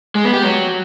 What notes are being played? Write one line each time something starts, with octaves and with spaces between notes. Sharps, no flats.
G#3
B3
G4
F#3